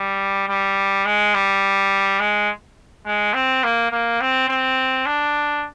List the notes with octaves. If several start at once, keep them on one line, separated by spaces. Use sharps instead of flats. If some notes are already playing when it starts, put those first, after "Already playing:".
Already playing: G3
G3
G#3
G3
G#3
G#3
C4
A#3
A#3
C4
C4
D4